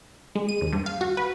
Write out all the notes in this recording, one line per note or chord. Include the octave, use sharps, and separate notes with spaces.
G#3
D#7
D#2
G2
F5
F#4
B4